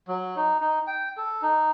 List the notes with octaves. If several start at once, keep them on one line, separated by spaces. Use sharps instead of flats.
F#3
D#4
D#4
G5
A4
D#4